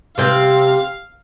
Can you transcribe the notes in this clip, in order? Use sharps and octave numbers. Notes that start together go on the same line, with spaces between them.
C3 C4 F5